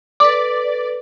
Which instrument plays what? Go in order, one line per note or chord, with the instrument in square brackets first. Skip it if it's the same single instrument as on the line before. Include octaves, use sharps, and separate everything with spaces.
[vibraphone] A4 B4 [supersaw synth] D5 [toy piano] D6